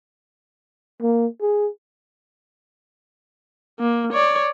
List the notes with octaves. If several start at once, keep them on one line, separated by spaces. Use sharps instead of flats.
A#3
G#4
A#3
C#5 D5